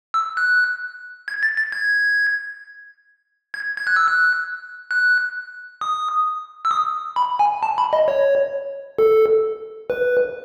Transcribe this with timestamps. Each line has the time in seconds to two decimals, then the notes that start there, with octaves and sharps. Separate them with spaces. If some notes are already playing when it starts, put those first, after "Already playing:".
0.14 E6
0.37 F#6
1.28 G#6
1.43 A6
1.57 A6
1.72 G#6
3.54 G#6
3.77 G#6
3.87 F#6
3.96 E6
4.08 F#6
4.91 F#6
5.81 D#6
6.65 E6
6.71 D#6
7.16 B5
7.39 G#5
7.63 A5
7.78 B5
7.93 D#5
8.08 C#5
8.98 A4
9.90 B4